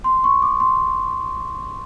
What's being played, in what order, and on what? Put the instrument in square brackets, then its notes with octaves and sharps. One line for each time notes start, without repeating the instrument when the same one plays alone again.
[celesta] C6
C#6
D6
C6